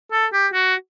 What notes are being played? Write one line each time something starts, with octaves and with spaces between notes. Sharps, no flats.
A4
G4
F#4